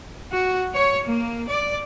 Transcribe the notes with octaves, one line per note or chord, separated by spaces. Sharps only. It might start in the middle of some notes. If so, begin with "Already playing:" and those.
F#4
C#5
A#3
D5